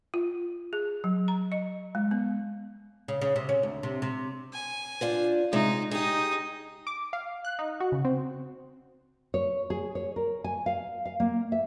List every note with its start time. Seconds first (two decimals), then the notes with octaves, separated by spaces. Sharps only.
0.14 F4
0.73 G#4
1.04 F#3
1.28 A#5
1.52 D#5
1.95 G#3
2.11 B3
3.08 C#3
3.21 C#3
3.36 C3
3.49 C#4
3.63 D2
3.83 C3
4.02 C3
4.53 G#5
5.01 D4 F4 C5
5.53 C3 G#3 D#4
5.91 D#4 G4 G#4 D#6
6.87 D6
7.13 F5
7.45 F#6
7.59 D#4
7.80 F#4
7.92 C#3
8.05 C4
9.34 C#5
9.70 G#4
9.95 C#5
10.16 A#4
10.44 G#5
10.66 F5
11.06 F5
11.20 A#3
11.52 E5